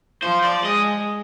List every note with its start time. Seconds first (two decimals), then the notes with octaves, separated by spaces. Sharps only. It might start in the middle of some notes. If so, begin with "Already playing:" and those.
0.22 F3 C5
0.44 D5
0.65 G#3 D#5